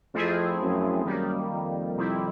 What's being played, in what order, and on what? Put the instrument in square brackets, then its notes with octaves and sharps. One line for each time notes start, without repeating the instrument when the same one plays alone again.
[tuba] F2 [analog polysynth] F3 A3 C4 E4 G#4
[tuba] F#2
[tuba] F#2 [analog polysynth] D#3 G3 A#3
[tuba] F2
[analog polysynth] C3 D#3 G3 C4 E4